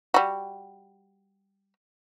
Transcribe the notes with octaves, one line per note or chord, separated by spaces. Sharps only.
G3 F#4